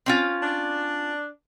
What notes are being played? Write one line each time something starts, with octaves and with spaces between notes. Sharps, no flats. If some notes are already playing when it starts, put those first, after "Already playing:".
C4 C#4 F4
D4